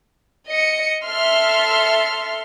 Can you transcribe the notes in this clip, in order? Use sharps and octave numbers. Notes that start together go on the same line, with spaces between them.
D#5 C#7
A4 E5 C6 F6